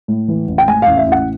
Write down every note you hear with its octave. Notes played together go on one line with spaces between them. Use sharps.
A2
E3
A1
G5
A2 G#5
A1 F5
E5
A1 F#5